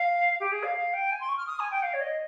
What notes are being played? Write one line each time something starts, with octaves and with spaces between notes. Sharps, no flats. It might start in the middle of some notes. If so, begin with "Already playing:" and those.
Already playing: F5
G4
G#4
F5
F5
G5
G#5
C6
C#6
F6
D#6
G#5
G5
F5
C#5
D#5